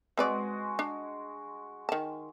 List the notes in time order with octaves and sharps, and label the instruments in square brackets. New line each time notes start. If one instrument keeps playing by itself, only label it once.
[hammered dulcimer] G#3 F#4 [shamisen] C4 B4 D5
[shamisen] D4
D#3 A5